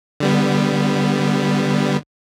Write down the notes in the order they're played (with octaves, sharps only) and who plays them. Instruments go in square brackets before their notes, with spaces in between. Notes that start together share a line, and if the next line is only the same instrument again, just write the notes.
[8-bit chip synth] D3 G3 B3